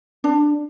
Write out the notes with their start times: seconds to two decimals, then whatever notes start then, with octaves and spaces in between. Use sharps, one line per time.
0.24 D4